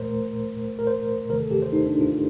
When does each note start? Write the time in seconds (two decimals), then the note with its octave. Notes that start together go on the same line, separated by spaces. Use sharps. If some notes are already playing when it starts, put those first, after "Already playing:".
Already playing: A#2 A3 A#4 C5
0.79 A#4
0.87 C5
1.29 C3 D#3 A3 A#4
1.40 A4
1.51 G4
1.62 C5
1.73 D#4
1.87 D4
2.01 F4